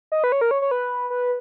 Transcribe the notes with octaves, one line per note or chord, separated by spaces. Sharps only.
D#5
B4
C#5
A#4
C#5
C#5
B4
B4